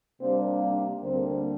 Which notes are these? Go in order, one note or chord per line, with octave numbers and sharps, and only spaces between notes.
C3 G3 A#3 C4 D4 C5
D4 D5
D2 D3 G3 A#3 C4 C5